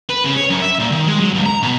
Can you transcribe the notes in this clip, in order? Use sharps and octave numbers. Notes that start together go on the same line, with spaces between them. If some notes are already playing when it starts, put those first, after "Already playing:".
B4
C#3
C#5
F#2
E5
A#2
D#3
G#3
F#3
C#2
A#5
B2